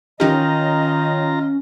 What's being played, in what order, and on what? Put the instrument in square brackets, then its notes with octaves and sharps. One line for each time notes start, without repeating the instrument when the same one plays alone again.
[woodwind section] D#3 D#5 [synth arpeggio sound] E3 D#4 G4 [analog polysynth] C#4 [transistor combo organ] F4 A#5